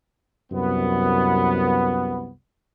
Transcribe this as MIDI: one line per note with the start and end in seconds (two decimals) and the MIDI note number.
0.52 2.31 36
0.52 2.31 42
0.52 2.31 59